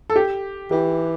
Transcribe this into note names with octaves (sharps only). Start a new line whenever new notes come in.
A4
G4
E3 G4